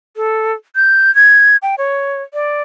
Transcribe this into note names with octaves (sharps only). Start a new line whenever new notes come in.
A4
G6
G#6
G5
C#5
D5